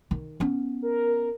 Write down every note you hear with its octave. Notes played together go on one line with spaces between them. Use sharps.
D#3
B3 C#4
A#4